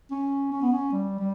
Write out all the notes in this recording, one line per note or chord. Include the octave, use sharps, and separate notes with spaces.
C#4
C#4
B3
C#4
G3
G3